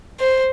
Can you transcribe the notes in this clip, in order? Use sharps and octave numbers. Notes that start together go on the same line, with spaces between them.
C5